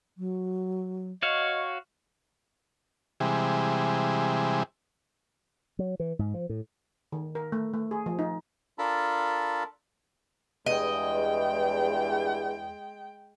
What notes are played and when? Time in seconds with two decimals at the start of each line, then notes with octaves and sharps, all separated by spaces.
0.18 F#3
1.23 F#4 C#5 D#5 F5
3.20 C3 E3 G3 G#3
5.79 F#3
6.00 E3
6.19 G#2
6.34 F3
6.49 A2
7.12 D#3
7.35 A#4
7.52 A3
7.74 A3
7.91 G#4
8.06 F3
8.19 D#4
8.78 D4 F4 A4 A#4 A5 B5
10.66 E2 G2 G#3 D#5 G5